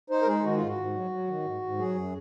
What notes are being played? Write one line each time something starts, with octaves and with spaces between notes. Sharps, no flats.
D#4 C5
A#4
G#3 G#4
D#3 F#4
G#2 F4
F#4
G#2
F#3
F#3
D#3
G#2
G#2
F#3 G#4
F#2